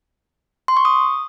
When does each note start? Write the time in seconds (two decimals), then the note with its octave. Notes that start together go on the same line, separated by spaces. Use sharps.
0.68 C6
0.77 C#6
0.85 D#6